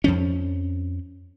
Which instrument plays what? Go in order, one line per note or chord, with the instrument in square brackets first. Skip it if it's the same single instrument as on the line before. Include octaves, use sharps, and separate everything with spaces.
[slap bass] F2 F3 C#4